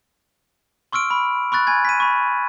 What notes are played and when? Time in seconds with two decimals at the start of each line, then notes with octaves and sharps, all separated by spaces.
0.92 C6 C#6 E6 F6 D7
1.11 B5
1.52 B5 C#6 F#6 A6
1.67 G#5 B5 G#6
1.85 B6 D#7
2.00 B5 C#6